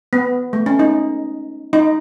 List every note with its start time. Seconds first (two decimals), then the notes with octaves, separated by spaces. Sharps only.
0.13 B3
0.53 A3
0.66 C#4
0.79 D#4
1.73 D#4